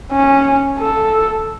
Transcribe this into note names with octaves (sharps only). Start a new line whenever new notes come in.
C#4
A4